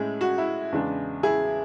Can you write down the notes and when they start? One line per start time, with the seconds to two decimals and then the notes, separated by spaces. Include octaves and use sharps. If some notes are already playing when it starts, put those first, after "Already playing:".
Already playing: A2 G#3 C#4 E4 G#4
0.21 F#4
0.38 E4
0.72 E2 C#3 G#3 D4
1.23 E4 G#4